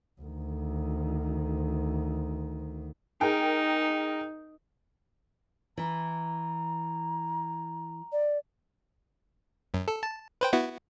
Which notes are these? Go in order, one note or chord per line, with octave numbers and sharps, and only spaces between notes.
D2 D#3
D#4 G#4 A#4 G5
E3 E4 A#5
D5
F#2
A4
A5
B4 C5 G5
B3 E4 F#4